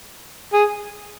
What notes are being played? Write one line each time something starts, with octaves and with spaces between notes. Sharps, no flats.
G#4